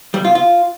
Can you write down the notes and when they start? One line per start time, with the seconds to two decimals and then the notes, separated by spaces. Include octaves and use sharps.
0.14 G3
0.25 F4
0.35 F4